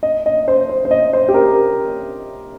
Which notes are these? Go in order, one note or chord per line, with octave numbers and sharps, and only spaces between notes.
D#5
D#5
C5
C5
C5
D#5
C5
G4
A#4